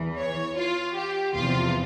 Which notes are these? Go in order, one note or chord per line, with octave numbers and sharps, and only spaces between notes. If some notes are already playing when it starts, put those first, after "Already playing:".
Already playing: E2 E3
C#5
F4
G4
E2 C3 F3 F4